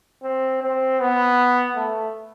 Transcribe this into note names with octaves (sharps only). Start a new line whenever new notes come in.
C4
C4
B3
A3